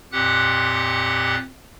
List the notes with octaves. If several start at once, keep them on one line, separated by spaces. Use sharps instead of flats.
F2 A#2 G4 F#5 F#6